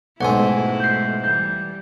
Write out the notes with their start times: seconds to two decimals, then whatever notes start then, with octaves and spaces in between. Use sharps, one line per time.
0.21 B1 G#2 G#3 A3 C4 E4 F#5 G#5
0.80 G6 C7
1.23 E3 G3 G6 C7